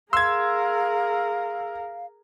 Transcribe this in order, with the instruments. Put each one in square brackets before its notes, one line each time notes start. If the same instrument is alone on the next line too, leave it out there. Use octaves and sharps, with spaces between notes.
[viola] G#4 A#4 [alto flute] F5 [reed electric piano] C6 [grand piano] E6 G#6